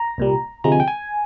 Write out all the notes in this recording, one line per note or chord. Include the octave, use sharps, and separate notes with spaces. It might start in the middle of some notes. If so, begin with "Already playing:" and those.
Already playing: A#5
C2 A#2 G3
D2 C3 F3 G#3 A#5
G#5
G5
G#5